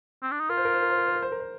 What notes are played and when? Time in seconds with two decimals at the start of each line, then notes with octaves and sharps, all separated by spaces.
0.22 C4
0.31 D4
0.40 D#4
0.49 F4 A#4
0.57 C5
0.65 A#4
0.74 C5
0.82 A#4
0.90 C5
0.98 A#4
1.06 C5
1.15 A#4
1.22 C5
1.32 A#4
1.40 C5